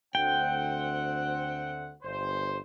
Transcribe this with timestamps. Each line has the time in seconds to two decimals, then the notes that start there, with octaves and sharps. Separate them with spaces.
0.15 D2 C4 F#5 G5
2.02 G1 C5